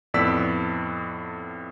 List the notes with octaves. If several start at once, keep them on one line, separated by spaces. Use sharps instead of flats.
F2 A2 B3 D5 E6 B6